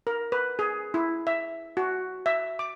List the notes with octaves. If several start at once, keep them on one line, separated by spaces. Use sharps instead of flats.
A#4
B4
G#4
E4
E5
F#4
E5
D6